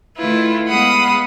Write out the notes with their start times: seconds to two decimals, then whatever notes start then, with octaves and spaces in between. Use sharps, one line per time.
0.17 D#3 A3 E4 F4 B4
0.68 G#3 B3 F5 F#5 B5 D#6